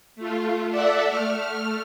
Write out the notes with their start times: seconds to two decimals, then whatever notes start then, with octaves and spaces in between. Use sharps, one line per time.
0.15 A3 F4
0.70 A4 D5 E5 F#5
1.08 A3 F6